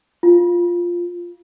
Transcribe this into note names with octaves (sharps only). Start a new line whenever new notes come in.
F4